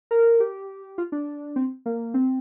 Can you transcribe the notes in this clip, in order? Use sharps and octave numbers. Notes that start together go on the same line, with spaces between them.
A#4
G4
F4
D4
C4
A#3
C4